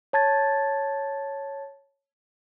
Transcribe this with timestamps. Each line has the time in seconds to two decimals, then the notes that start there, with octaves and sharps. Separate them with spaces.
0.13 C#5 A5 G#6 A6